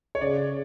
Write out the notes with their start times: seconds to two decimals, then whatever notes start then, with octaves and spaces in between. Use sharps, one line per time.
0.15 C#5
0.21 C#3 D5